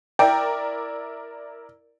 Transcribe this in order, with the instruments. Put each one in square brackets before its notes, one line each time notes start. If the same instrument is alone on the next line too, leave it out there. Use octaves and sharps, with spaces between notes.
[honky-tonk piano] E4 A#4 D5 [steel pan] G5